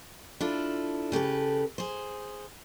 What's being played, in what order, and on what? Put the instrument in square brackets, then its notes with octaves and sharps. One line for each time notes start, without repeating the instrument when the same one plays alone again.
[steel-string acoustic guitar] D4 E4 F4 A4
C#3 G4 A4 B4
G#4 C5